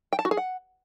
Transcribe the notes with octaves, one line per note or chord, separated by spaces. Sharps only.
G5
A5
F#4
G#4
F#5